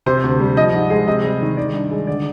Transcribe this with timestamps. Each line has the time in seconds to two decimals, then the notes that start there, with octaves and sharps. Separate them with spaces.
0.06 C3 C5
0.24 D2
0.40 G3
0.57 F3 D#5
0.74 G#2
0.90 G#3
1.08 C3 D#5
1.24 G3
1.41 D#3
1.57 D#3 D5
1.74 G2
1.91 G#3
2.07 D3 D5